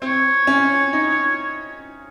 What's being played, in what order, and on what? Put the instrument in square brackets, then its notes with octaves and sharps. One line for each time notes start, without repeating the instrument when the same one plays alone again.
[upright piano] C4 [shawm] C#5
[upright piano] C#4
D#4